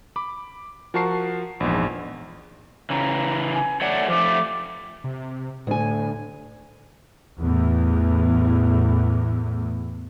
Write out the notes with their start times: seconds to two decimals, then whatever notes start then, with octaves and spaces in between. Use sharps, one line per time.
0.16 B5 D6
0.94 F3 F#4 A#4 A5 C#6 C7
1.60 A#1 E2 G#2
2.90 C#3 E3 A#5
3.53 G#5
3.81 A3 C#5 D5 F#5
4.08 F3 A3 D6
5.04 C3
5.67 D2 A2 G#5
7.37 E2 A2